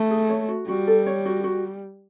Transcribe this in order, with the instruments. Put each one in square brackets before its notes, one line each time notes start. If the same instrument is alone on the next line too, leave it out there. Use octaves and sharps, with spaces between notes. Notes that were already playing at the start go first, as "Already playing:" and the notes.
Already playing: [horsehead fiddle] A3
[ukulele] G#4
C#5
F#4
[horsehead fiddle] G3 [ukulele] F#4
[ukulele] A4
C#5
F#4
F#4